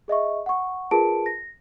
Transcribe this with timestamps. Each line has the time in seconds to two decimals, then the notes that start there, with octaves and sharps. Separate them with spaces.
0.08 G#4 D#5 E5 C#6
0.46 F#5 C#6
0.91 F4 G#4 A#4 B4 A5 D7
1.26 A#6